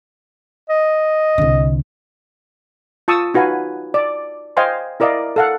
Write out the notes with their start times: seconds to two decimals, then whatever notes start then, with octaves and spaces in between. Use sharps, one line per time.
0.69 D#5
1.38 C2 D3
3.08 F4 A5 C#6 D#6 E6
3.34 D#4 F#4 B4 F5 G#5
3.94 D5
4.57 C5 D#5 F5 G5 G#5 C6
5.00 E4 A#4 D5 D#5 F5
5.36 A4 F5 F#5